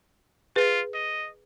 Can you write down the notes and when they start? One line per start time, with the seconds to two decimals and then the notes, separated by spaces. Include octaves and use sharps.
0.56 F4 G#4 B4
0.94 D#5